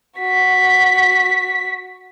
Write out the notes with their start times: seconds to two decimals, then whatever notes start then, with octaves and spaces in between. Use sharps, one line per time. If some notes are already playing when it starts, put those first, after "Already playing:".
0.19 F#4 B6